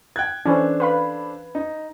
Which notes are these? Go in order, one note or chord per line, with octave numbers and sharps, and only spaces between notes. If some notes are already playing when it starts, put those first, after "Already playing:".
G5 F#6 G#6
E3 C#4 D4 A4 C5
B4 F5 B5
D#4